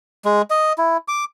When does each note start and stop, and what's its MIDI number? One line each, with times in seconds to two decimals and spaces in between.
0.25 0.42 56
0.50 0.73 75
0.78 0.97 64
1.08 1.24 86